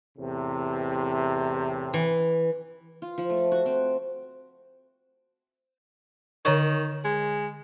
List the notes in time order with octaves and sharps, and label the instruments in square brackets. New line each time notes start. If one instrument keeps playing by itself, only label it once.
[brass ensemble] E2 A2 C3
[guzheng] E3
[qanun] F4
F3
A3
F#4
C4
[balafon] D3 C#5 C#6 [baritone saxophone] D#3
[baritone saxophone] G#3